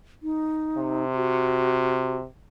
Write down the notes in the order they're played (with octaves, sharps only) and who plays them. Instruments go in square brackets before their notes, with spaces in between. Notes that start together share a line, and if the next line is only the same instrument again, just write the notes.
[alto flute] D#4
[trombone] C3
[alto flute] F#4